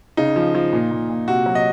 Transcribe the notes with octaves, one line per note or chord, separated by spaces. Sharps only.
C#3 D#4
F3
F3
A#2
A#2
A#2
C3 F#4
F#3
D#5